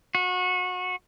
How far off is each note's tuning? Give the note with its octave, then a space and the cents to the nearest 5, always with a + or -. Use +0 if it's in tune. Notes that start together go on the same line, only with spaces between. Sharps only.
F#4 -25